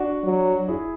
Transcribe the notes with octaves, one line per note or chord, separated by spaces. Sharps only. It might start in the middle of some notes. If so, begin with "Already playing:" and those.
Already playing: D4 F#4
F#3
E4 G#4